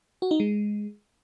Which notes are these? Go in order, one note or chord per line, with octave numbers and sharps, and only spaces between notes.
F#4
D#4
G#3